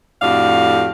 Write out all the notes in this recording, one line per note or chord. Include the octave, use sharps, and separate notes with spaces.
F2 A2 D4 F#4 G4 F5